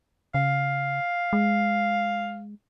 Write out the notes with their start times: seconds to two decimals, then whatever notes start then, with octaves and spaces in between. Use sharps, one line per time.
0.34 C#3 F5
1.33 G#3